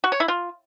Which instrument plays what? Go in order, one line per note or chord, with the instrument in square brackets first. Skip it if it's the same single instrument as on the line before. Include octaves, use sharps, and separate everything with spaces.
[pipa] F#4
C#5
E4
F4